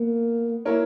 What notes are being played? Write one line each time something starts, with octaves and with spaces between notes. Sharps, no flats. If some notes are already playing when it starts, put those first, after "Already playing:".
Already playing: A#3 B3
A#3 E4 A#4 C#5